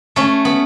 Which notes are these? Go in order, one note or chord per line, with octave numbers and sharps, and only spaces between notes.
A3 C#4
B3